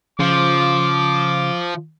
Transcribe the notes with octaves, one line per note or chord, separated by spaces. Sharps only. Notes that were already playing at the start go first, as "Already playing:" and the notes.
C#3 F3 D6